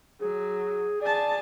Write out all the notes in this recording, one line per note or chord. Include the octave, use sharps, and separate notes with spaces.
F#3 G#4
G#4 D5 A5